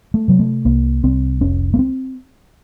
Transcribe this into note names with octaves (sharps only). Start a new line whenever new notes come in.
A3
C3 F#3
A3
C2 A#3
C2 C4
F1 C#4
A#3
C4